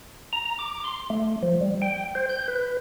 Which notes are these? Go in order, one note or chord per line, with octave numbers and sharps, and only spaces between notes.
A#5
D6
C6
A3
F3
G3
G5
C5
G6
B4